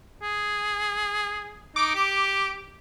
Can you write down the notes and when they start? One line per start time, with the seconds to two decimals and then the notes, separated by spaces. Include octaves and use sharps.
0.23 G#4
1.76 D#4 D6 D7
1.95 G4